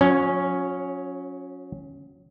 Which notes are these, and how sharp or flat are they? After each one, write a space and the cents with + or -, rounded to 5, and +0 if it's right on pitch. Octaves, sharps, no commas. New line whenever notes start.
F#3 -40 C#4 +0